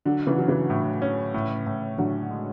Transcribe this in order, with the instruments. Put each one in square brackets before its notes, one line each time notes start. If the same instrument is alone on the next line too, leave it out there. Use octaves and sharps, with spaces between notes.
[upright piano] D3 [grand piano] F#3
[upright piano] C#3 E3
[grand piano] F#3
[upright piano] C#3 E3
[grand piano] A2
C#4
A2
A2
[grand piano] A2 [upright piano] D3 F#3
[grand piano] G#3